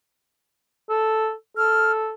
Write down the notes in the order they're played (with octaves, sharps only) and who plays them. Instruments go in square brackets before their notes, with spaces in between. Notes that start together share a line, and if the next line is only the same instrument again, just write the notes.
[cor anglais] A4
[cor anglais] A4 [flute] F6